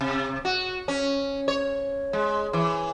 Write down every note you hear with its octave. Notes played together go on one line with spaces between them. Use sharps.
C3
F#4
C#4
C#5
G#3
E3